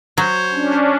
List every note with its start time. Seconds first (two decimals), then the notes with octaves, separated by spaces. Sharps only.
0.18 F#3 C5 C#5
0.54 C#4 D4